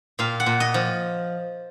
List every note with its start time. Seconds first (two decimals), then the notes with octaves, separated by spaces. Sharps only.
0.19 A#2 F5
0.40 F#5
0.46 A#2
0.60 D#5
0.74 F3